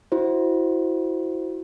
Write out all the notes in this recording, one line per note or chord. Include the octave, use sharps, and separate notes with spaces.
E4 F#4 C5